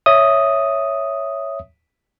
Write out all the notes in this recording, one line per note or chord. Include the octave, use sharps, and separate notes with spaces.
C#5 E5 D#6